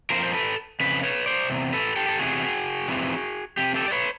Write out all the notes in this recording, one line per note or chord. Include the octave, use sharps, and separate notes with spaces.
F2 C#3 F3 A#4 C5
C5
A4 B4
F2 C#3 B4
B4 C#5
C5 D5
E2 C3
A4 B4
G4 A4
A4
E2 C3 E3 F#4 G#4
F2 C3 E3
F2 C3 G4
G4 A4
D5
B4 C#5